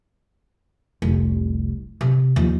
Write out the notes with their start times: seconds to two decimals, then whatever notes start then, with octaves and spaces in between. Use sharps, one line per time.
1.02 F1 C2
2.01 C3
2.36 D#2 F3